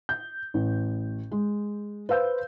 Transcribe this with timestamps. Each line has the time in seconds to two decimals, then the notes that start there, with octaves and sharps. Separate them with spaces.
0.09 G6
0.54 A1
1.32 G#3
2.09 B4 C5 F5 E6 G6